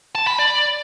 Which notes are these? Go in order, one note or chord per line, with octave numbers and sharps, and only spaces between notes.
A5
B5
D5